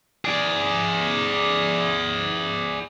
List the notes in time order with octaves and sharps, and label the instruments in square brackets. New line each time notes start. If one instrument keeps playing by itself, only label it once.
[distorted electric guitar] G#4 D5